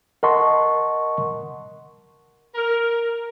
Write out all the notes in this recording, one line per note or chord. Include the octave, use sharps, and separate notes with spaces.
A#4 D#5 F#5 A5 C6 C#6
A#4